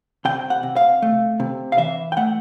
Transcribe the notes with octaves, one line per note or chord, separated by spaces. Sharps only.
C3 G5
F#5
C3
F5
A3
C3
F5
E3 E5
G5
A3 F#5